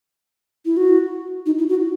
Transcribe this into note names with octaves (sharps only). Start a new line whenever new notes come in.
E4
F#4
D#4
E4
F#4